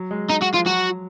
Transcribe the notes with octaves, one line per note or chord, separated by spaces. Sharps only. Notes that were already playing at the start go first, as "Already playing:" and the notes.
Already playing: F#3
G#3
D#4
F#4
F3 F4
F#3 F#4